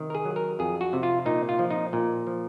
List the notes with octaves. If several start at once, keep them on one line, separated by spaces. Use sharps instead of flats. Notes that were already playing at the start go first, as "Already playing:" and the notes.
Already playing: C3 D#3
A#4
G#4
F#3
A#4
F2 G#4
F#4
C3
F4
A#2 D#4
F4
F3
D#4
A#2
F3